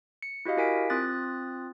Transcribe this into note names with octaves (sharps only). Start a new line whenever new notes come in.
C#7
E4 F#4 G4 D#5 F5
E4 G4 A#4 G#5 B6 D7
C4 F4 D#6 F#6 A6